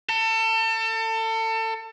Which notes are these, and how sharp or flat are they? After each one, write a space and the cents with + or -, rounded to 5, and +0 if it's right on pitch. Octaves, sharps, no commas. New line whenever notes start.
A4 +30